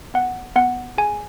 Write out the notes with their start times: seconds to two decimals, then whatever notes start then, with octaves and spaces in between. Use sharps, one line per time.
0.14 B3 F#5
0.56 B3 F#5
0.98 G#4 G#5